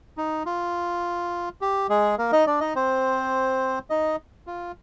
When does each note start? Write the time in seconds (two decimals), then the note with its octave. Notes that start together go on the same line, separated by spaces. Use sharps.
0.17 D#4
0.46 F4
1.61 G4
1.89 G#3 G#4
2.18 A#3 A#4
2.32 D#4 D#5
2.47 D4 D5
2.60 D#4 D#5
2.76 C4 C5
3.90 D#4 D#5
4.47 F4